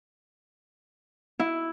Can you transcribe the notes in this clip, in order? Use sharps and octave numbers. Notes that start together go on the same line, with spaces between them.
E4